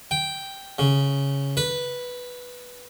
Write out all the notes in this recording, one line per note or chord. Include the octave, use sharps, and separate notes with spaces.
G5
C#3
B4